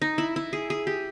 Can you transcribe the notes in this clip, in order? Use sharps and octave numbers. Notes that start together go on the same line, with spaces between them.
D#4
E4
E4
G#4
G#4
G4